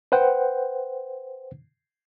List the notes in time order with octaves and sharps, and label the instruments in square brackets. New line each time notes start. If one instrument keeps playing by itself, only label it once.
[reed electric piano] B4 C5 F#5 G5